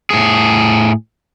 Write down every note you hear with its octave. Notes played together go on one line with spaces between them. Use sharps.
A2 G#4